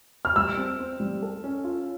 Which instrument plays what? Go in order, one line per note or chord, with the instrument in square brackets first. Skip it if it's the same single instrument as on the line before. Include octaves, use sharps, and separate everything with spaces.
[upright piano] F6
[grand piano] G3 [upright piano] E6
[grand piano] C4
C4
G3
A4
C#4
F4